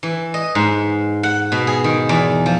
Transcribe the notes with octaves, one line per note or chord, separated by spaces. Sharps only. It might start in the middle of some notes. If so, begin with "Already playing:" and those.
E3
D#5
G#2
F#5
B2
G#4
D#3
E2
F3